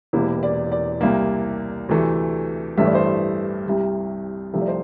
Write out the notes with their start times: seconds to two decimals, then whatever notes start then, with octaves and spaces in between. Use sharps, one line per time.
0.13 E1 E2 C3 E3 A#3 E4
0.43 D5
0.72 D5
1.01 C2 C3 G3 A#3
1.89 D2 C3 E3 A3
2.77 A1 G2 E3 A3 E5
2.86 D5
2.95 C5
3.04 D5
3.66 C2 C3 G3
4.54 C2 C3 F3 A3 E5
4.61 D5
4.68 C5